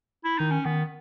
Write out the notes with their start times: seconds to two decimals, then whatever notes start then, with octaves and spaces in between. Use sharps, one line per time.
0.24 E4
0.38 D#3 D#4
0.51 C#4
0.65 D#3 B3